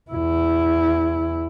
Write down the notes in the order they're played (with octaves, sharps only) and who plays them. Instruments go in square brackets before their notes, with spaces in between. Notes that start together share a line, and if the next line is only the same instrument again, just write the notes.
[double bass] E2 E4